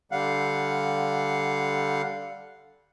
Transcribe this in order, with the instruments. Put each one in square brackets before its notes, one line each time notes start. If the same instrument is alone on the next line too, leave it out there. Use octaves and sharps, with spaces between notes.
[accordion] D3 G3 F5 F#5